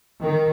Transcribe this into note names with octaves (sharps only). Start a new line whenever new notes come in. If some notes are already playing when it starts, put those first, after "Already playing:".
D#3